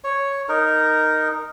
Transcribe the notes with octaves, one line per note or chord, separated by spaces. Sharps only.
C#5
D#4 A#4